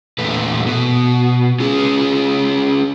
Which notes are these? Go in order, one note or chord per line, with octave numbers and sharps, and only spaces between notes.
E2 A#2 A3 B4
B2
C#4 F4 G#4